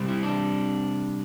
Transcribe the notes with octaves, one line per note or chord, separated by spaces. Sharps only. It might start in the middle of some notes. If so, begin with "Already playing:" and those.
Already playing: C3 G3 C4
E4
D4